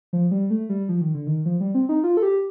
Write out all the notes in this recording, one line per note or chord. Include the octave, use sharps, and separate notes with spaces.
F3
G3
A3
G3
F3
D#3
D3
D#3
F3
G3
C4
D#4
F4
A4
G4